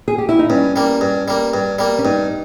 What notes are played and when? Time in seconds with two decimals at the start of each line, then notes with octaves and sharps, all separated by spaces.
0.08 G#4
0.18 G4
0.29 E4
0.39 D#4
0.50 G2 C#4
0.76 G3 A#3
1.01 G2
1.28 G3 A#3
1.54 G2
1.79 G3 A#3
1.99 C#4
2.05 G2 D#4